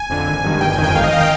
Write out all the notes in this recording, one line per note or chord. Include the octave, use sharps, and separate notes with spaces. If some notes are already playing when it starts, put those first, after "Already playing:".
Already playing: G#5
F2 D3
G#1
G2 D#3
G1 G5
G#5
F2 D#3
G5
G#1 F5
D#5
F5
D#3 G5